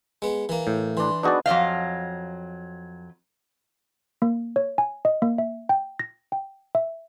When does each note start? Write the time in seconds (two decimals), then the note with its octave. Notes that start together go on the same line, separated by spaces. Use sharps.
0.22 G#3 B3
0.49 E3 A#3
0.67 A2
0.97 E3 D4 C6
1.23 B3 D4 D#4 F#4 G#4 D5
1.46 F2 F#3 D#5 F5
4.22 A#3
4.56 C#5
4.78 G#5
5.05 D#5
5.22 A#3
5.38 E5
5.69 G5
5.99 A#6
6.32 G5
6.75 E5